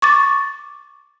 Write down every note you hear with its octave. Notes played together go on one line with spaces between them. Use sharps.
C#6 D6 A6